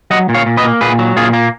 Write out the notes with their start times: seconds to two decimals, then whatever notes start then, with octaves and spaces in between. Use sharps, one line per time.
0.10 F#3 D#5 F#5
0.29 A#2
0.34 C#5 F5
0.46 A#2
0.57 B4 D#5
0.64 A#3
0.81 A#2 G#4 B4
0.99 F#3
1.16 A#2 F4 G#4
1.33 A#3